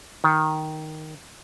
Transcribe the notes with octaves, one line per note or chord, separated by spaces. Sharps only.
D#3